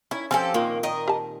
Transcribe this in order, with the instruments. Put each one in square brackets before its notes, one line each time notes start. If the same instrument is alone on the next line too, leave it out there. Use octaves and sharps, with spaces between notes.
[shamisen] D#3 [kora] C#4 [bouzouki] E4
[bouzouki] F3 G4 A4 [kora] C4 [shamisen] C#4 G#5
[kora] A#2 D#3 F3 [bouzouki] A#3
[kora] D#3 [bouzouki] A#4 D#5
[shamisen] G4 A5